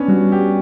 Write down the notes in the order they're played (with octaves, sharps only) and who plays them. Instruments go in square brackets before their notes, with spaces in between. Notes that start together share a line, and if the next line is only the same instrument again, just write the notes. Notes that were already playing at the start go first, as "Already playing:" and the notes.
Already playing: [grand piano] B3 C#4 D4
[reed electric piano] G3 [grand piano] F#4
[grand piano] G4